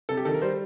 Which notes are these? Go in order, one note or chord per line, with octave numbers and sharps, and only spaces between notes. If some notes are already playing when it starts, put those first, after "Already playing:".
C3 A4
G4
D#3 A4
A#4
G3 C5